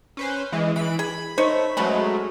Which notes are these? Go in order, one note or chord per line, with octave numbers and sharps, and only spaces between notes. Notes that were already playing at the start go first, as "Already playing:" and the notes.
C#4 B4 C5
E3 G#3
E3 B5 D7
G#4 B5
A3 D#4 C5 C#5
B2 F#3 G#3 A3 C#4 B5